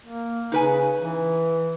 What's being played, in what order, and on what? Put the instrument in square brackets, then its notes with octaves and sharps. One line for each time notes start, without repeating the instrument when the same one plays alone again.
[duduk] A#3
[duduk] C#3 [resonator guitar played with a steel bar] D#4 B4 G#5
[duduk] E3